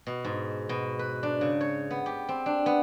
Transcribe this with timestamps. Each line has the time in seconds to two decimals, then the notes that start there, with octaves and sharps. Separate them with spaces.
0.07 B2
0.24 G#2
0.69 B2
0.99 B4
1.23 D4
1.41 C#3
1.61 C#5
1.91 B3
2.06 G4
2.29 C4
2.46 D4
2.66 B3